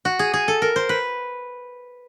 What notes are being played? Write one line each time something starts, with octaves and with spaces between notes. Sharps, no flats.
F#4
G#4
G#4
A4
A#4
C5
B4